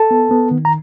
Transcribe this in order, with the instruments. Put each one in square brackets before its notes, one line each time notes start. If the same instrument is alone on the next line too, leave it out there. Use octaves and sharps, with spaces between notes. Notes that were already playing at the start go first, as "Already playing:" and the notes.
Already playing: [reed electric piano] A4 A5
B3
B3
D#3
A#5